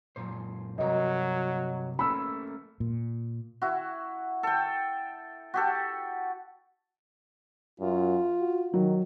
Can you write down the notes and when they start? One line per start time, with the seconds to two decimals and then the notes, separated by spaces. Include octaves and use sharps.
0.16 F#2 A#2 C5
0.78 G2 C3 F#3 A#4 D#5
1.99 A3 A#3 C#4 B5 E6
2.80 A#2
3.62 E4 F#4
4.43 A4 G5
5.54 F#4 G4 A4
7.80 F#2 F4
8.40 F#4
8.74 D#3 F#3